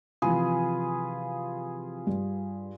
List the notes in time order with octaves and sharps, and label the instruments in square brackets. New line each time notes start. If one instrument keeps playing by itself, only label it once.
[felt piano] C3 E3 F3 [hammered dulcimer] F4 G#4 B4
[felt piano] G2